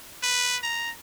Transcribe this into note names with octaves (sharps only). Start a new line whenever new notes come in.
B4
A#5